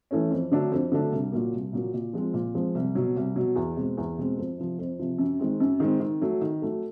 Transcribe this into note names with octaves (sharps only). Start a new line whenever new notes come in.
E3 A3 C#4
F2
D3 F#3 A3 D4
F2
D3 F#3 A3 D4
C2
A#2 F#3 A#3
C2
A#2 F#3 A#3
A#2
F3 G#3 C4
A#2
F3 G#3 C4
C2
B2 F#3
C2
B2 F#3
E2
B2 G#3 C4
E2
B2 G#3 C4
F2
C3 F3
F2
C3 F3
F#2
D#3 G#3 C4
F#2
D#3 G#3 C4
D#3
F#3 A3
D#3
F#3 A3